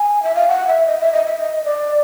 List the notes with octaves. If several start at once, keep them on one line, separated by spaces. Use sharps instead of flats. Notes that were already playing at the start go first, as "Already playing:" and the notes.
Already playing: G#5
E5
F5
F#5
E5
D#5
E5
D#5
E5
D#5
D5